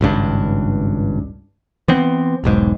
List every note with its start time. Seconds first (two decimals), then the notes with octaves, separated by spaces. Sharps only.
0.01 G#1 C#2 G2 D4
1.88 E3 B3 C4
2.44 E1 B1 G#2